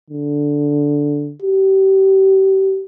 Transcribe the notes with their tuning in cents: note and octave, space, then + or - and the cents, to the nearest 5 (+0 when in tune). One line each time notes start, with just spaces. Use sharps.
D3 -5
G4 -30